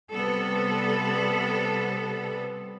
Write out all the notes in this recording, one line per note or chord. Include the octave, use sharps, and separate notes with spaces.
C3 G3 B3 A4